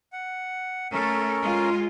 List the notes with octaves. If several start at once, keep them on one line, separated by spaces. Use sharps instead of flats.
F#5
A3 C#4 A4 A#4
G#3 F4